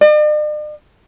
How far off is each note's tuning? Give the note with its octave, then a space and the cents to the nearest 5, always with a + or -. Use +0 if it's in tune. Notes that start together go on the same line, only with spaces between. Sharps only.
D5 +45